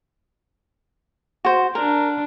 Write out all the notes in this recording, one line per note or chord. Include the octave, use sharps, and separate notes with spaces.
F#4 C5
D4 A#4